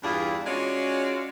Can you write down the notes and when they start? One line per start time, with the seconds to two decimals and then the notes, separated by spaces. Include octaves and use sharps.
0.03 E2 G2 D4 E4 F4 G#4
0.47 G#3 C#4 F4 F#4 C#5 D5